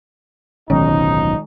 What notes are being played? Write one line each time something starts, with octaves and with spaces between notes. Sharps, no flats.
D1 B1 D#3 F3 G#3 C#4 D#4